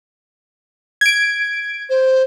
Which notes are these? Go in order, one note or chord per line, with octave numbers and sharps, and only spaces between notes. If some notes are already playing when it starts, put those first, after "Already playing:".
G#6 D7
C5